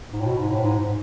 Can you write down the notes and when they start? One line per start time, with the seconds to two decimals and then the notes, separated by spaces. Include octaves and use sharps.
0.13 G#2
0.21 A2
0.26 B2
0.39 G#2
0.51 A2
0.63 G#2